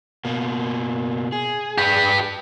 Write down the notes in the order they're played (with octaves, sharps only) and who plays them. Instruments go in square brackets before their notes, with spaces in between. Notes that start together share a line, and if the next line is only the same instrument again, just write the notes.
[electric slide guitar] B2 A#3
G#4
[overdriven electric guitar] G4 B4